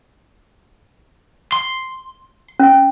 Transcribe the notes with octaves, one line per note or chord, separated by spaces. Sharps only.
C6
C#4